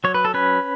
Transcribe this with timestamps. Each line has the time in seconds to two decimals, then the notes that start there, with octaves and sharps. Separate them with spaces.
0.04 F#3 C#5
0.14 B4
0.25 A4
0.34 C#4 B4